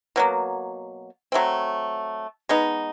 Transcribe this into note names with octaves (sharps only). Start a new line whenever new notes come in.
B2 F#3 A#3
F#3 A3 C4
G#3 B3 D#4